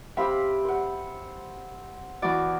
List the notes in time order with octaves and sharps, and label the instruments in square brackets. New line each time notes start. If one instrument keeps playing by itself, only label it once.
[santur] C4 G4 C5 [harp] E5 F5 B5
[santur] C5 F#5
[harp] E2 D5 [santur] E4 F#4